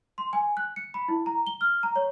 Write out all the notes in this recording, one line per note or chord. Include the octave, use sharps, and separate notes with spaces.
C6
G#5
F#6
C#7
B5
E4
A#5
G7
F6
A#5
C#5